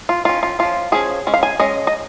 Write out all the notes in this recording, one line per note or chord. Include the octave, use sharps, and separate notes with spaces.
F4
D#3 C#4 F4
F4
F3 C#4 F4
F3 C#4 G#4
G#3 C#4
F5
G#5
G#3 C#4 D#5
D#5